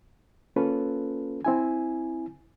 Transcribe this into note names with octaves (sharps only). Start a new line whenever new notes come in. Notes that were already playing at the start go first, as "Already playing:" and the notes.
A#3 C#4 F4 A4 B4
C4 E4 G#5